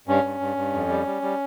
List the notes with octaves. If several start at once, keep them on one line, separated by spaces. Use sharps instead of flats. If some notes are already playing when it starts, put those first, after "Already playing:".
G2 C#4
G2
G2
G2
F2
G3
G3
G3